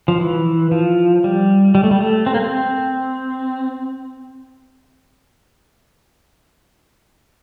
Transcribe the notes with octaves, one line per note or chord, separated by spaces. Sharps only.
F3
E3
F3
G3
G3
A3
G3
A3
C4
A#3
C4